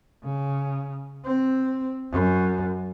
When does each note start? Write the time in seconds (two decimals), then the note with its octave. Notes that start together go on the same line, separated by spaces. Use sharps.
0.23 C#3
1.25 C4
2.11 F#2